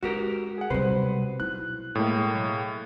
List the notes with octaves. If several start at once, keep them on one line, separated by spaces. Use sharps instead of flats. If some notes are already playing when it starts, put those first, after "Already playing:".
G#3 F#4 G4 A#4
G#4 F#5
B1 C3 G3 B4 C5
D#4 E4 F#6
A2 G#3 A#3